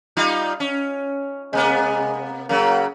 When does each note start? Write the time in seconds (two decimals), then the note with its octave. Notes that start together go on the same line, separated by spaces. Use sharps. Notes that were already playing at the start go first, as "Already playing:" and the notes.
0.17 G3 D#4 F4
0.60 C#4
1.53 C3 G#3 A#3 B3
2.49 C#3 F#3 A#3